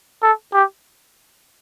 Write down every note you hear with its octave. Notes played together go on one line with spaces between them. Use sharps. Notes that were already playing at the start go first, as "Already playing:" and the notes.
A4
G4